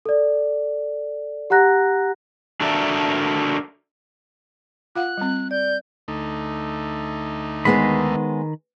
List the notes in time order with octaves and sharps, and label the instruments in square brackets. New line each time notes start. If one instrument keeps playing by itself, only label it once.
[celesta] A4 D5
G4 F#5 A#5 F#6 A#6
[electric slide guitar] D4 F#4 A4 A#4 D5 E5
[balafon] F4 F5 F#5 [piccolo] F#6
[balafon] G3 C4
[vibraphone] D5 [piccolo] G6
[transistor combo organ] D2 A3 D#4
[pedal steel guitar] D#3 B5 [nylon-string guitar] G#3 B3 C5